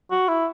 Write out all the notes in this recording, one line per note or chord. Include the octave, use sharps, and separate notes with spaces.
F#4
E4